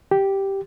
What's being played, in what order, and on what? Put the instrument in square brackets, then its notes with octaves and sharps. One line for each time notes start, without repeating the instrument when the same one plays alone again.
[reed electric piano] G4